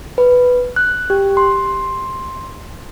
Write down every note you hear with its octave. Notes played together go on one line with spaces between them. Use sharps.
B4
F#6
G4
C6